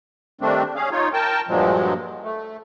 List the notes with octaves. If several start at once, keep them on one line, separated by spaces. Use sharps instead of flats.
D#3 G3 A3 C4 D4
C#4 G#4 F5
D#4 F4 C#5
A#4 G5 A5
G2 A#2 F3 F#3 G#3
A3